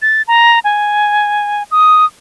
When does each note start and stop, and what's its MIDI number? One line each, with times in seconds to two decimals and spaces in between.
0.02 0.22 93
0.28 0.59 82
0.64 1.63 80
1.71 2.05 87